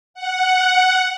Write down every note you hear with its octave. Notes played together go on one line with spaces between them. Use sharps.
F#5